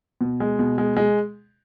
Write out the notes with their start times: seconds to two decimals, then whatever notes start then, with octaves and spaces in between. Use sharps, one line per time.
0.21 B2
0.40 G#3
0.59 B2
0.78 G#3
0.97 G#3